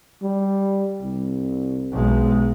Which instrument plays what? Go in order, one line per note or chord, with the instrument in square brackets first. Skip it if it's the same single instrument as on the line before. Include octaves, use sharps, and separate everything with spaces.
[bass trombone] G3
C2
[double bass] B1 G#3